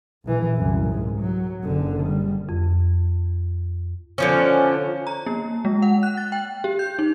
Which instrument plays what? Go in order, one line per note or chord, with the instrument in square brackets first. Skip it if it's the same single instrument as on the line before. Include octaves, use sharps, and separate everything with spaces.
[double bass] A#1 E3
C2 F#2
G#2
F#3
F#1 D3
G3
[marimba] F2
[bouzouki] D3 F3 C#4
[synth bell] A#5
A#3
G#3
F#5
F#6
A6
G5
G4
G6
D#4